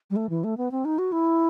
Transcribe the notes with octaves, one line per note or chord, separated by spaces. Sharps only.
G3
A3
E3
A3
B3
C4
D#4
F#4
E4